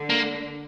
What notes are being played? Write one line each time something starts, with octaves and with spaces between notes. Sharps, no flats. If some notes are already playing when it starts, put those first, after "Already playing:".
Already playing: D3
A#3